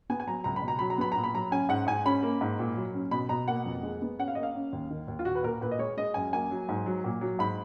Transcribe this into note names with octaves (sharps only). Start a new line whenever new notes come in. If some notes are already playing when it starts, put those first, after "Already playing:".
B3 G#5
G#5
F#3 A#5
C#2 A#5
B5
B2
A#5
F#3 B5
A#5
B3 B5
A#2 A#5
B5
F#3 A#5
C#4 G#5
G#2 F#5
G#2 G#5
C#4 B5
A#3
G#2
A#2
F#3
C#4
B2 B5
B2 A#5
A#3 F#5
F2
G#3
B3
C#4 F#5
F5
A#3 D#5
F5
C#4
D#2
D#3
D#2
F4
A#2 F#4
B4
A#2 A#4
A#2 B4
D#5
G#3 C#5
G#3 D#5
F#2 G#5
A#3 G#5
F#3
G#2
F#3
A#2
F#3
G#2 B5